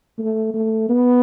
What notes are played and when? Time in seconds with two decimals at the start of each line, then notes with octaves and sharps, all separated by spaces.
0.19 A3
0.54 A3
0.89 B3